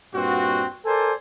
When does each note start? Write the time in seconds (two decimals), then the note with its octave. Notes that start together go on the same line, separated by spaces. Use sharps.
0.14 G2 A#2 C4 F#4
0.86 A4 A#4 C5 D5 G#5